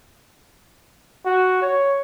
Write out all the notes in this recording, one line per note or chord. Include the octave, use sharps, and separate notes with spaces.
F#4
C#5